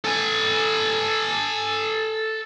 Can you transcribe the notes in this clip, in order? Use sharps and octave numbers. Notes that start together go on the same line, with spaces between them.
A4 G#5